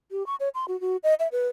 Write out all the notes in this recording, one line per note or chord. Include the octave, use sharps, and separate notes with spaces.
G4
C#6
C#5
C6
F#4
F#4
D#5
E5
B4